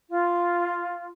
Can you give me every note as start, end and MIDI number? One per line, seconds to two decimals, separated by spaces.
0.10 1.05 65